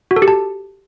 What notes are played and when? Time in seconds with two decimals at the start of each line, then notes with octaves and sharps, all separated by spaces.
0.11 F#4
0.16 A4
0.22 G4
0.28 A5